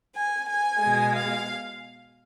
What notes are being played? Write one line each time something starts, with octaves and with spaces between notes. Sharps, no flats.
G#5
G#5
B2 G#3
F5